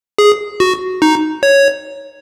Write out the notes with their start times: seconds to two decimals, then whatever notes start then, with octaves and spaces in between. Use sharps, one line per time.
0.18 G#4
0.60 F#4
1.02 D#4
1.43 C#5